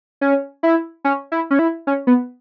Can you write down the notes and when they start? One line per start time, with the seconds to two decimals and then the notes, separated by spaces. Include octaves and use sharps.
0.21 C#4
0.63 E4
1.04 C#4
1.32 E4
1.51 C#4
1.59 E4
1.87 C#4
2.07 B3